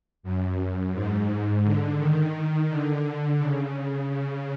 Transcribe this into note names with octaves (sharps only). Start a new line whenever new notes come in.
F#2
G#2
D3
D#3
D3
C#3
C#3